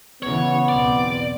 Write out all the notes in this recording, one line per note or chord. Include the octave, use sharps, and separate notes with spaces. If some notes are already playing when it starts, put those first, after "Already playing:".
C#3 E3 B3 C#5
B1 E2 C4 D5